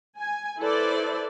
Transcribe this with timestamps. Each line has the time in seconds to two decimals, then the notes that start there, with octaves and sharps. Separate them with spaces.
0.18 G#5
0.59 E4 A4 B4 C5 D5